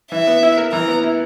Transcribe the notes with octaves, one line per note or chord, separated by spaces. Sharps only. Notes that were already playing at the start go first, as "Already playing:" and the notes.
E3 E5
B3
E4
A#4
E3 A#5
B3
E4